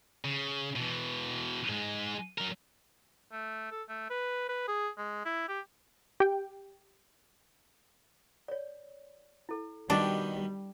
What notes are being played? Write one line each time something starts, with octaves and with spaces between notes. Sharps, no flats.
C#3
B2 E3
G#2 G#3
F#3 A#4
A3
A4
A3
B4
B4
G#4
G#3
E4
G4
G4 G5
C#5 D5
E4 A4
B2 D#3 G3 D4 A5 D6